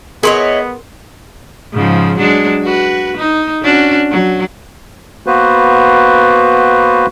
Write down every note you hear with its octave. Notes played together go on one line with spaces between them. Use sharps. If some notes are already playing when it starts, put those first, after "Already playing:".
B3 E4 G#4 A#4 C#5 D#5 C6
G#2 C#3 F3
F#3 G#3 D4
F#4 B4
D#4
C#4 D4 F#4
F#3
A#3 B3 F#4 B4 C5